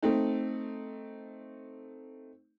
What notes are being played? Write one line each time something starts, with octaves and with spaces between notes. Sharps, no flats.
A3 C4 D#4